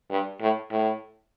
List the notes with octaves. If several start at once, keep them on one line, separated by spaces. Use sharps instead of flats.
G2
A2
A2